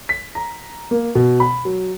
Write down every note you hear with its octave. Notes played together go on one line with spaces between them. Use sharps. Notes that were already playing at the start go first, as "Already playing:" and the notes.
B6
A#5
A#3
B2
B5
F#3